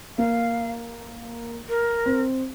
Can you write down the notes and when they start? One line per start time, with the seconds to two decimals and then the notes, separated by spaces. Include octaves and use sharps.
0.18 A#3 F5
1.69 A#4
2.06 C4